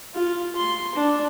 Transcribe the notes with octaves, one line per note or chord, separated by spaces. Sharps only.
F4
C6
D4